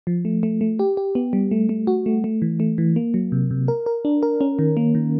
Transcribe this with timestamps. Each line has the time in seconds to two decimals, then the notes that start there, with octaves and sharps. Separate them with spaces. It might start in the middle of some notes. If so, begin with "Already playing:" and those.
0.07 F3
0.25 A3
0.43 A3
0.61 A3
0.79 G4
0.97 G4
1.15 B3
1.33 G3
1.51 A3
1.69 A3
1.87 F#4
2.06 A3
2.24 A3
2.42 E3
2.60 A3
2.78 E3
2.96 A#3
3.14 F#3
3.32 C3
3.51 C3
3.68 A#4
3.86 A#4
4.05 D4
4.23 A#4
4.41 C#4
4.59 D#3
4.77 A#3
4.95 D#3